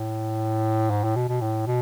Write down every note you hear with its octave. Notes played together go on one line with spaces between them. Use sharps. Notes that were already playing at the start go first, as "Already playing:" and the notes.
Already playing: A2
G#2
A2
B2
B2
A2
B2